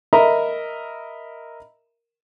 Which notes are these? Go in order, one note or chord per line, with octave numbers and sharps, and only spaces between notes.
A#4 D#5 E5 A#5 B5